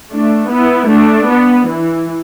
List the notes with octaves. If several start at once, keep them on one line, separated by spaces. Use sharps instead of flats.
A3 D4
B3 E4
A3 D4
B3
E3